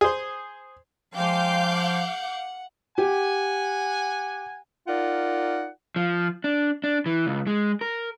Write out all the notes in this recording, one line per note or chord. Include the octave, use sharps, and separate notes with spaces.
G#4 C5
F3 G#3 F5 G5 D6 G6
F#5
G4 F#5 G#5
D#4 F4 A#4 D5 F#5
F3
D4
D4
E3
C#2
G#3
A#4